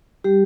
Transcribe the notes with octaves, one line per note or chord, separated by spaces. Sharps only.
G3 G4